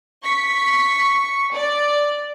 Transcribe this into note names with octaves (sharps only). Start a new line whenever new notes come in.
C#6 B6
D5